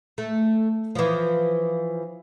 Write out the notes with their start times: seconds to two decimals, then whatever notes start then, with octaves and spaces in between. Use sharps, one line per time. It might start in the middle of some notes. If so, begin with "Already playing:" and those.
0.18 A3
0.95 E3 F3